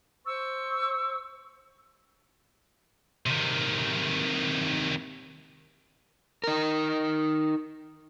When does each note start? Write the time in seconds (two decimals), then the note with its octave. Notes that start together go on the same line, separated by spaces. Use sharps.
0.25 C5 C#6 E6
3.26 C3 D#3
6.44 D#4 A#4